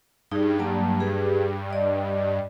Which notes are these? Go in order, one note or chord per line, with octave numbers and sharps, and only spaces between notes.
G2 D#4 G#4
F#3 A#3 A5
G4 G#4 B4
D5 D#5